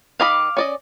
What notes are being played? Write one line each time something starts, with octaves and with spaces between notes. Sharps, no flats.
D#3 D#5 F5 B5 D6
C#4 D5 D#5